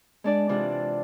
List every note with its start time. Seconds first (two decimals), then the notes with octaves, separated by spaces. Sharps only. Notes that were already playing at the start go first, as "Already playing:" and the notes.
0.24 G#3 D4 D5
0.49 C3 E3 D4 F4